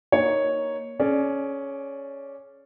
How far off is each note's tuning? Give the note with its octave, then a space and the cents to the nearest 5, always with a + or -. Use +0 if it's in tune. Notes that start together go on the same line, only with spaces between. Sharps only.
A#3 +5 D#4 +0 C#5 +0
C#4 +0 G#4 +35 D5 +0